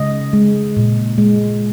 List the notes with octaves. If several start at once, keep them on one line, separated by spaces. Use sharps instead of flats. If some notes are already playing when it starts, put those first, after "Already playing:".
Already playing: C#3 G#3 D#5
G#3
A#2
G#3